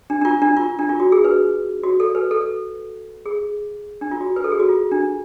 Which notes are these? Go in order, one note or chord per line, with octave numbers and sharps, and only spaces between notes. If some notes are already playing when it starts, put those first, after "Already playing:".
D4
D4
F4
D4
F4
D4
F4
F#4
G#4
B4
F#4
A4
B4
A4
G#4
D4
F4
F#4
B4
A4
G#4
F#4
F4
D4